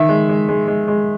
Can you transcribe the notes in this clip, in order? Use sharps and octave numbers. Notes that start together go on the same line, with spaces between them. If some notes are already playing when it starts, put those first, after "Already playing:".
Already playing: D#3 E5
G#3
G#3
G#3
G#3
G#3